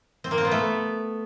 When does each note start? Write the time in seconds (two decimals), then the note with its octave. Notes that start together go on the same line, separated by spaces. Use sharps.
0.24 C4
0.31 A#3
0.38 C4
0.45 B3
0.51 A3